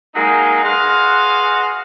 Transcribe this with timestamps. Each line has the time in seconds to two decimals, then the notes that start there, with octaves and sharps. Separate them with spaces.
0.15 F#3 G#3 A#3 D#4
0.64 F#4 G#4 B4 D#5 F5 C6